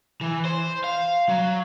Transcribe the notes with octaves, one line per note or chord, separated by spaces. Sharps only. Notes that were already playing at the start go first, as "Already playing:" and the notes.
E3
C5
F5
F#3